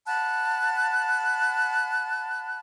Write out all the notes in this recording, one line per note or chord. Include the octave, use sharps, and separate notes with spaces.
F#5 A5 B5 F#6